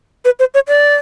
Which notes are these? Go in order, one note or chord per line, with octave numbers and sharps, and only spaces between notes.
B4
C5
C#5
D5